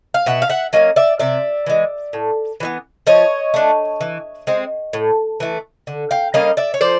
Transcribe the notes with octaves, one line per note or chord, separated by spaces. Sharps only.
F5
B2 E5 F#5
F5
E5 F#5
F#3 A#3 C#4 D#5 F5
D5 E5
C3 D5 E5
E3 G#3
A2
E3 G3 B3
F3 C#5 D#5
A3 D4
E3
G#3 C4
A2
E3 A3
D3
F5 G5
G3 A#3 C#4 D#5 F5
D5 E5
C#5
F3 C5 D5